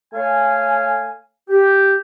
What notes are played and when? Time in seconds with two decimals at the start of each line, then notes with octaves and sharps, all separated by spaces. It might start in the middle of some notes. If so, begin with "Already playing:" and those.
0.13 A3 C#5 F5 G#5
1.50 G4